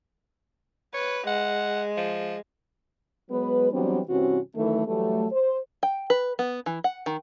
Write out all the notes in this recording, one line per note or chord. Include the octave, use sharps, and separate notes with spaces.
B4 C#5
G#3 F#5
F3
F#3 G#3 B3 B4
E3 F#3 G3 B3 C4 D4
G2 C3 E3 C4 C#4 F#4
F#2 D#3 E3 A3
E3 F#3 G3 A3
C5
G5
B4
B3
E3
F#5
D#3